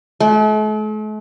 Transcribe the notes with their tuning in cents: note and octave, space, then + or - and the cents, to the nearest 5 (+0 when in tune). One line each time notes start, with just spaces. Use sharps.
A3 -45